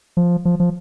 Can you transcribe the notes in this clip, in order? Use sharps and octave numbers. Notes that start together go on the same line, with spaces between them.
F3
F3
F3